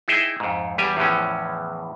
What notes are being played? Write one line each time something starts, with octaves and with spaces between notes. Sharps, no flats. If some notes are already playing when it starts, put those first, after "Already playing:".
D#4 E4 G#4 E5 G5
F2 G#2
E2 G3 G4 G#5
E2 A2 E3 F3 C#4